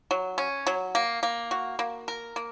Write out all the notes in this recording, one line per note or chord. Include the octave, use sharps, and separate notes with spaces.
F#3
C#4
F#3
A#3
A#3
F#4
A#3
A#4
A#3